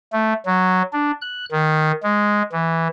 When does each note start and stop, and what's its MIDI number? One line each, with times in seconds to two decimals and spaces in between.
0.13 0.34 57
0.46 0.83 54
0.93 1.11 62
1.21 1.45 90
1.52 1.92 51
2.03 2.43 56
2.52 2.88 52